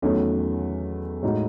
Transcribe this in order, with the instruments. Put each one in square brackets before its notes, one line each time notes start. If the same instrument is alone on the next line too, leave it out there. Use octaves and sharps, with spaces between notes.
[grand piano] E2 D#3 F#3 A3 C#4
A2 G#3 D#4 F#4